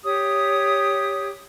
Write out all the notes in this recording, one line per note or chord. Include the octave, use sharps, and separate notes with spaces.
G4 C#5 D#6